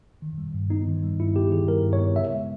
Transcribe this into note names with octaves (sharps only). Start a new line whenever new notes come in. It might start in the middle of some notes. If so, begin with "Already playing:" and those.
D#3
G3
G2
B3 D#4
D#3
G3
G2 E4
B3 G4
D#3 G#4
G3 A#4
G2
C#5
B3
C#3 E5
G#3